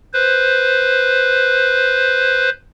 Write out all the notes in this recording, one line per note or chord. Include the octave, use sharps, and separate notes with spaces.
B4 C5